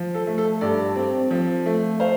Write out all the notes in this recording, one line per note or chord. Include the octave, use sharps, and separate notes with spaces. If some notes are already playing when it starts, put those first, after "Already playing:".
Already playing: F3
A4
A3
A4
G2 A4 D5
C4
F3
A3
C5 F5